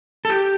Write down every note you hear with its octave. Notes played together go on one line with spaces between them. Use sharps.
A4
G4